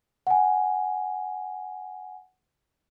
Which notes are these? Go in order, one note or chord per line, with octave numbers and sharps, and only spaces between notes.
F#5 G#5